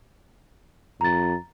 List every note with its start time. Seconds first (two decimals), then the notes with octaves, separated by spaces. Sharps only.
1.01 F2 A#5 A6